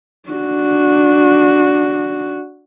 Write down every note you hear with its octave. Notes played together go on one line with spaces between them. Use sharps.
D4 F#4